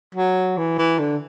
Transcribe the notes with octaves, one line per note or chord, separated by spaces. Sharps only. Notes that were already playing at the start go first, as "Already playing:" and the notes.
F#3
E3
E3
D3